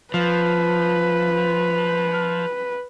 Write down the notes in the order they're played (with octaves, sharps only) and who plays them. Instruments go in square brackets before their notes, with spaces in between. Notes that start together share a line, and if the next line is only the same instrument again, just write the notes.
[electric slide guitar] F3 [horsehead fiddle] B4